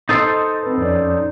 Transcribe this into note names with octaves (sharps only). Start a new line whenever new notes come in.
D#4 A4 C5 D#5 D#6 A6
C4 B4
F2 C#4 D5